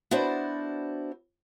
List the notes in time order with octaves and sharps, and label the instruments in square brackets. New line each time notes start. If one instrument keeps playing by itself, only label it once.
[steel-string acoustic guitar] B3 D4 E4 F#4 C5 D5